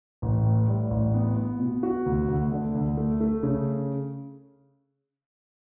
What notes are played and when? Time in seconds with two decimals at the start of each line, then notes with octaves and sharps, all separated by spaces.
0.22 A1
0.45 A2
0.68 G3
0.91 A1
1.14 B3
1.37 B3
1.60 B2
1.83 F#4
2.06 D2
2.28 D2
2.52 D3
2.75 D2
2.97 A3
3.20 A3
3.43 C#3